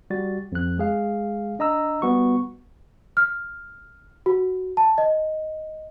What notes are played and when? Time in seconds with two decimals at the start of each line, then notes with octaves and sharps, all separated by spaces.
0.10 G3 F#4 A6
0.52 F2 F#6
0.78 G#3 G#4 F5
1.59 D4 D#5 A#5 E6
2.02 G3 B3 F#4 C#6
3.17 F6
4.26 F#4
4.77 A5
4.98 D#5